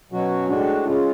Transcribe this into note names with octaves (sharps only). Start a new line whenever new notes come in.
B2 F#3 C#4 F#4
A2 G#3 D4 F#4
C#3 G#3 C#4 F4